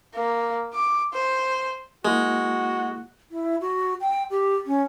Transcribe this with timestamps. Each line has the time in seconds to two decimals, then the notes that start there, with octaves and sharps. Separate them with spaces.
0.14 A#3
0.74 D6
1.13 C5
2.05 G#3 A#3 E4 F#4
3.31 E4
3.61 F#4
4.01 G5
4.30 G4
4.66 C#4